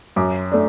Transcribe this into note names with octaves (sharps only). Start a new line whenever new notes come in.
F#2 D6
A3 D4